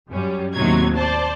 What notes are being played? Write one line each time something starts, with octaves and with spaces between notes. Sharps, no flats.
F#2 G3 C#4
D#2 A2 C3 F#3 D#4 G#6
C5 D5 A5